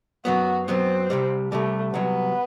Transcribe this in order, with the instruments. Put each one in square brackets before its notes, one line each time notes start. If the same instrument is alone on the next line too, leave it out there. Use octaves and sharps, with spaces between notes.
[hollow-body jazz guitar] F#2 F#3 B3 [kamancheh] F#4
[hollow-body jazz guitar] F#2 F#3 B3 [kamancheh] C4
[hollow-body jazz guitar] C2 C3 G3
[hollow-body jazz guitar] C2 C3 G3 [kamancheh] A3
[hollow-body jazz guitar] C2 C3 F#3 [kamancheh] B3